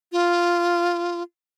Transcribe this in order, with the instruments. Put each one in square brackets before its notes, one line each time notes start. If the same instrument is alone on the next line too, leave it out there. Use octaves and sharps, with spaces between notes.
[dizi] F4